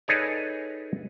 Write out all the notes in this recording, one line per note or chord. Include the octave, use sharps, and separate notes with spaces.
D#4 G#4 A4 B4 C#5 D5